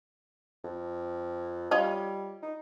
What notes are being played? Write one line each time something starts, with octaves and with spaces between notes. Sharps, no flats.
F2
G3 F4 C#5 D#5
D#4